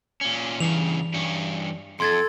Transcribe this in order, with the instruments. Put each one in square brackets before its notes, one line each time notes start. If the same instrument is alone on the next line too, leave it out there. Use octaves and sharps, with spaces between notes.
[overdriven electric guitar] A#2 C#4
[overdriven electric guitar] G2 C#3 [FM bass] E3 [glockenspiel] F7
[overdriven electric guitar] G2 C#4
[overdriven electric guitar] F2 [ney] A4 [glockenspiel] C6 G#6 A6